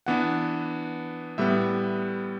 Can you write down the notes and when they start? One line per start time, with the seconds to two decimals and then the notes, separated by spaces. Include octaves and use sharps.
0.06 E3 B3 D4 F#5
1.38 A2 G3 B3 E5